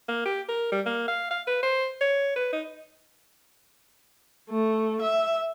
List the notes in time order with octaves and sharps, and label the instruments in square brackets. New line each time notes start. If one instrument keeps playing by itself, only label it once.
[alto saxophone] A#3
G4
A#4
G3
A#3
F5
F5
B4
C5
C#5
B4
D#4
[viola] A3
E5